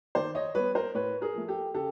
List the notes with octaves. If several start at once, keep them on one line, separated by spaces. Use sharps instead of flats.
D#3 C5 D5
C#5 D#5
G3 B3 B4 C#5
A#4 C5
A2 B4 C#5
G#4 A#4
F3 A3
G4 A4
C#3 G4 A4